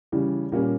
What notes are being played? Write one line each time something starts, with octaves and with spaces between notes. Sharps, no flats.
C#3 E3 G3
A#2 G3 A#3 C#4